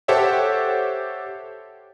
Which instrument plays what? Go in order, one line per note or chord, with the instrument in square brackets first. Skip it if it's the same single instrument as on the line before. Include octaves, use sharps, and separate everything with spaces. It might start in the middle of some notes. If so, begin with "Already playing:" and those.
[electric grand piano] G4 A4 C5 C#5 E5 F#5